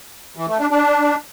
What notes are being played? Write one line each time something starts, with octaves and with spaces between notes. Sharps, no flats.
E3
A3
D4
D4